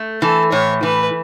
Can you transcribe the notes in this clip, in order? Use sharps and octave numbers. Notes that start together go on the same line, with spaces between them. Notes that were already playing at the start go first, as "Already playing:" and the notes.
Already playing: A3
E3 A4
A2 C#5
E3 B4